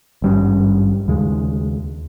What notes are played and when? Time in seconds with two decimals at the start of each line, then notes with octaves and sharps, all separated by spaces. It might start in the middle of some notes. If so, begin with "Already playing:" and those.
0.22 G#1 G2 G3 C#4
1.08 D#2 C#3 G#3